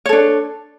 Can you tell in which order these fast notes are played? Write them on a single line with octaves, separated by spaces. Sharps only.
C#5 A4 D4